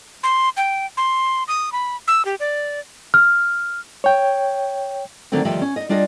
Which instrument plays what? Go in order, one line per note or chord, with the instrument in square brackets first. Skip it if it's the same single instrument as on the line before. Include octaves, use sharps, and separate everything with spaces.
[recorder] C6
G5
C6
D#6
B5
E6
G4
D5
[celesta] F6
[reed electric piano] C#5 G5
[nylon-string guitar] D3 D#3 F#3 A3 C4
D2 D#3 F3 G3 G4 E5
C#4
D#4 D#5
G3 D4 F4 G#4 D#5